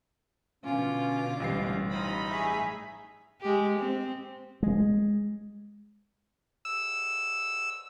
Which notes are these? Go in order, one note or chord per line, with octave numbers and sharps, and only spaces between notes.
B2 D3 C#4 F4 D6
A1 F#2 G3 G#3 C#4 C7
D#4 F4 B5
A3 G#4 E5
G#3 G4
C4
G#3
E6